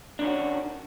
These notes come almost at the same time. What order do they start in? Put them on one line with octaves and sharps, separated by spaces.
D4 D#3 C#4 F#4